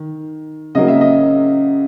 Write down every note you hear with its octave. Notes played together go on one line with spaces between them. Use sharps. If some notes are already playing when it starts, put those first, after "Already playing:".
Already playing: D#3
C#3 F#3 A#3 D#5
E5
D#5